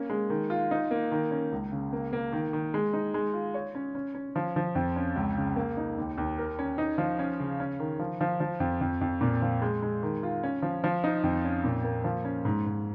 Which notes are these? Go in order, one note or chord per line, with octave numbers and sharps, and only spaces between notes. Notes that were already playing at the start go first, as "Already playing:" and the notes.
Already playing: A#3 C#4
G#3
D#3
F4
D#4
A#3
D#3
C#4
C#2
C#3
A#3
A#3
D#3
D#3
G#3
D#4
G#3
F4
C#5
C#4
C#4
C#4
F3
F3
F2
C#4
C#2
C#3
A#3
D#4
D#2
D#2
A#4
C#4
D#4
F3
C#4
C#3
C#4
D#3
F3
F3
F3
F2
F2
F2
A#2
F3
G#3
G#3
D#3
F4
C#4
F3
F3
D#4
F2
C#4
A#2
A#3
F3
C#4
G#2
G#2